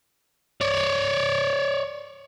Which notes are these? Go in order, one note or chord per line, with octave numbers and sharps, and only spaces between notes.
C#5 D5